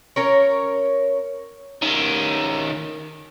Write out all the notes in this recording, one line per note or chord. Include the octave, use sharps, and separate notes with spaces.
C#4 A#4 C#5
D#3 C#4